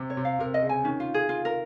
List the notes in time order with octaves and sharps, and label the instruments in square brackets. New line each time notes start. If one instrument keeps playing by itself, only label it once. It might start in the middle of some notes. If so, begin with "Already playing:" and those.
Already playing: [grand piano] C3
[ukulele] C#5
[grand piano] C3
[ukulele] F5
[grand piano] C3 [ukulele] A#4
[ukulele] D#5
[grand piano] C#3
[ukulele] G#5
[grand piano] D#3 [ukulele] C#4
[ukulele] F4
G#4
F4
A#4